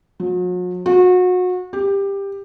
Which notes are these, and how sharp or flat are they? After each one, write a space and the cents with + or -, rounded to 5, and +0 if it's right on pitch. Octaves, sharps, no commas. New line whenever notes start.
F#3 -45
F#4 -30
G4 +15